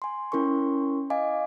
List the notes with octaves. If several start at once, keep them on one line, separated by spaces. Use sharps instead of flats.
G#5 C6
C#4 E4 A#4 C6 C#6
D#5 F5 G#5 D6